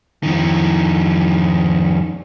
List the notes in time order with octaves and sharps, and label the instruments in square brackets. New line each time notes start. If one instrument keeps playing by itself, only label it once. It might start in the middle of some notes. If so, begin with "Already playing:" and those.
[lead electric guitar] F2 D#3